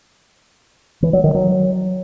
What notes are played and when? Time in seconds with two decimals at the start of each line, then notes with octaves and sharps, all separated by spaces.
1.03 E3
1.13 F#3
1.24 D#3
1.35 F#3